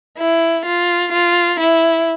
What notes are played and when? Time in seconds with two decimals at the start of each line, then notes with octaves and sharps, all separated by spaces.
0.18 E4
0.65 F4
1.12 F4
1.60 E4